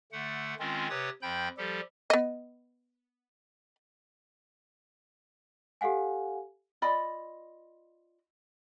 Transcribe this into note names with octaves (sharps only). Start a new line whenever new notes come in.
D3 A3 F#5
D#3 G#3 C4 C#4 F4
C3 G4 B4 C#5 D#6 A6
F2 F3 G5 B5 G6
F3 G3 G4 A4
B3 D#5
G4 A4 F5 F#5 G#5
F4 D5 D#5 B5